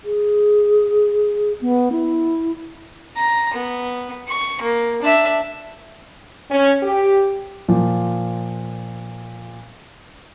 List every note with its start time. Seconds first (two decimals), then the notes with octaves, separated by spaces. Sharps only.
0.04 G#4
1.61 B3
1.92 E4
3.17 A#5
3.54 B3
4.29 C#6
4.62 A#3
5.02 D4 E5
6.50 C#4
6.83 G4
7.68 A#2 F3